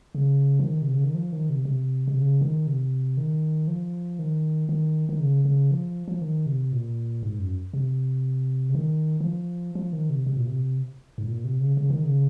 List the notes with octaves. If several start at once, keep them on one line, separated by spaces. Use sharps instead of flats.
C#3
F3
D#3
C3
C#3
D#3
F3
D#3
C3
C3
C3
C#3
D#3
C3
D#3
F3
D#3
D#3
D#3
C#3
C#3
F3
F3
D#3
C3
A#2
G#2
F#2
C3
C#3
D#3
D#3
F3
F3
D#3
C3
C3
A#2
C3
G#2
A#2
C3
C#3
C#3
D#3
C#3